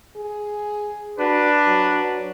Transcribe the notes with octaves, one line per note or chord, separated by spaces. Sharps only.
G#4
D4 F#4 B4
F#3